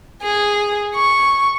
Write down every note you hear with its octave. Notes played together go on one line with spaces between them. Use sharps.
G#4
C#6